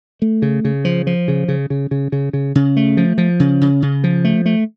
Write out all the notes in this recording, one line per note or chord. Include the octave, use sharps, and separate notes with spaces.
A3
C#3
C#3
F3
F3
C#3
C#3
C#3
C#3
C#3
C#3
C#3
A3
F3
F3
C#3
C#3
C#3
F3
A3
A3